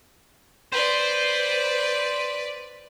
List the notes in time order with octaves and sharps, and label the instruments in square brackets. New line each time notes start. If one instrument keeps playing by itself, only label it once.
[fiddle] B4 D5 [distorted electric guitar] C5